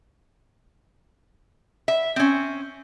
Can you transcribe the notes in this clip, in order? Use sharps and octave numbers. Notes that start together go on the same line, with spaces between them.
E5
C4 C#4